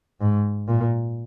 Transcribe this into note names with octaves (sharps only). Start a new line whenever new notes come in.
G#2
A#2